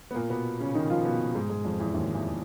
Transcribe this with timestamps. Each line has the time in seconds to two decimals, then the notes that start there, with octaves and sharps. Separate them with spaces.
0.11 B3
0.15 A#2 A#3
0.29 B2 B3
0.60 C#3 C#4
0.74 D#3 D#4
0.90 F3 F4
1.05 B2 B3
1.35 G#2 G#3
1.49 G#2 G#3
1.65 F2 F3
1.80 E2 E3
1.94 D#2 D#3
2.14 E2 E3